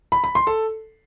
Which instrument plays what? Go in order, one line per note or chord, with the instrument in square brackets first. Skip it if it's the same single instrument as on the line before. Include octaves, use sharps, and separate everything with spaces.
[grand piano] B5
B5
C6
A4